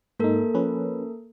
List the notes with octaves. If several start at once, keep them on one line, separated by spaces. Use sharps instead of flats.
G#2 A#3 D#4 A4 A#4
F3 C#4 B4